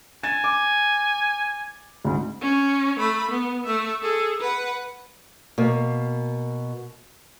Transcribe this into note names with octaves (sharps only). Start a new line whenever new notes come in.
G#5 A6 E7
D6
D2 G#2
C#4
A3 B5
B3
A3 E5
G#4 A4
B4 F#5
B2 A#3